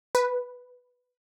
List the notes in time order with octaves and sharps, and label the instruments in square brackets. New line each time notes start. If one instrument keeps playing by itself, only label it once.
[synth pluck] B4